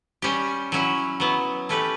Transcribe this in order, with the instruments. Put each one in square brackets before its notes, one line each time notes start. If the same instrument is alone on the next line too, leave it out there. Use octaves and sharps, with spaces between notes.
[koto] G3 C#4 G4
F#3 C#4 E4
F#3 B3 E4
A3 C#4 G4 B4